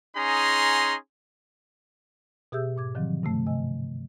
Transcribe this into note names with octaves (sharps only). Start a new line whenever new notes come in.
C#4 D#4 G#4 A#5 C6
B2 G4 G#4 E5 E6 G6
G#2 D6 G#6
D3 D#3 F3 F#3 C4
G2 C3 A3
C3 D#5 G#5